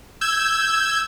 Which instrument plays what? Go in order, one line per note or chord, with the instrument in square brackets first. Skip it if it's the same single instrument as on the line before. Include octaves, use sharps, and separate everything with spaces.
[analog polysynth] E6 G6 G#6